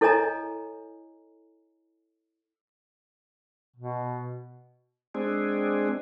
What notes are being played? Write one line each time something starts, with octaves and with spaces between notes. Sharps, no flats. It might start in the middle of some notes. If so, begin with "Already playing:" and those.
E4 A4 C#5 D#5 G#5 A#5
B2
G#3 C4 D4 G#4